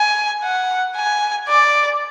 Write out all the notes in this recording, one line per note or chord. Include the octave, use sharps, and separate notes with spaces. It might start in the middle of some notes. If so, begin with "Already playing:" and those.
Already playing: G#5
F#5
G#5
D5